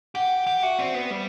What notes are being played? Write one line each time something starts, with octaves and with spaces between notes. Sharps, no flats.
G4 F#5
G4 F#5
F#4 E5
C4 D5
B3
G3 D5